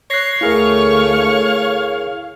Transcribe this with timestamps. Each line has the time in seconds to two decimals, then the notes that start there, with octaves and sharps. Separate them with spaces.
0.11 C#5 F#6 A#6 C7
0.41 D2 A3 E4 G#4 A#4 F5 C#6